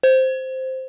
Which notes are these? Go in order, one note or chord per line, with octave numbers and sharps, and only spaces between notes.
C5